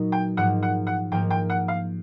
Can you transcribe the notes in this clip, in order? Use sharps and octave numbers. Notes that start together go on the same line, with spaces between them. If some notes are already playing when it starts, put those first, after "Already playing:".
Already playing: A#2 F#3 B3 D#4 F#4
G5
G#2 F3 A#3 F#5
F#5
F#5
G#2 F3 A#3 G5
G5
F#5
F5